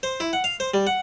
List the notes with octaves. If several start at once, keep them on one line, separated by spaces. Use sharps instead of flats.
C5
E4
F#5
F5
C5
G3
F#5